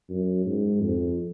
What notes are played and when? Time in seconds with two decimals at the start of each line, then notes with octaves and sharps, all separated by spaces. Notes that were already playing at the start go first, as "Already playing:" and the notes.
0.09 F#2
0.46 G#2
0.81 F2